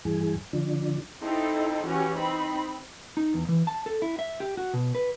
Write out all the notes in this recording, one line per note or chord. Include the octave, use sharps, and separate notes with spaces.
G2 E3 G#4
D3 F3 D4
C4 D#4 E4 A4
E3 C#4 F#4 G4
C4 D#4 B5
D#4
E2
E3
A5
A4
E4
E5
G4
F#4
B2
B4